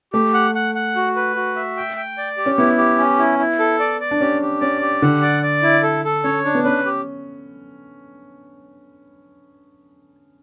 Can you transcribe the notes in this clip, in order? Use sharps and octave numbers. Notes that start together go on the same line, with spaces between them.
A3 G4
F#5
F#5
F#5
F#4
B4
F#4
E5
G5
G5
D5
G4
C#4
B3 E4
G4
C#4
E4
E4
A4
D5
D5
D4
C#4 G4
G4
C#4 D5
G4
D3 F#5
D5
D5
E4
A4
A4
C#4 C#5
D4
B3
C#4 B4
G4